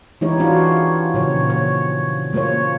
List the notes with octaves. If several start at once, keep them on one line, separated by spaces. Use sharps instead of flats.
E3 G#3 D#4 E4 G4 C#5
G#3 C4 D4 F4 F#4 C#5
A#2 C#3 F3 C#5
C#5
G#3 A#3 F4 C5 C#5